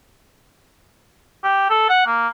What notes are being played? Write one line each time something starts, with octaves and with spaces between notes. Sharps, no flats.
G4
A4
F#5
A#3